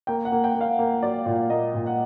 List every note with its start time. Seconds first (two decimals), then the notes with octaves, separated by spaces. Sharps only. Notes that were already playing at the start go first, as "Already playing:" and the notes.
0.07 A#3 G5
0.25 F#5
0.32 A#3
0.44 G5
0.55 A#3
0.61 F5
0.79 A#3
1.03 F#3 D5
1.26 A#2 D5
1.50 A#3 D#5
1.74 A#2
1.86 F#5